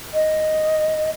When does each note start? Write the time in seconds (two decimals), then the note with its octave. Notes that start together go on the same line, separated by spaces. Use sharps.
0.14 D#5